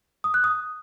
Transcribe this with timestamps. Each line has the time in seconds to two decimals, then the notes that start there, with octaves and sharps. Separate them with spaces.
0.24 D#6
0.34 F#6
0.44 D#6